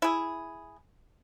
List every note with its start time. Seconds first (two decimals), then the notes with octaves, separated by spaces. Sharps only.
0.02 E4 G#4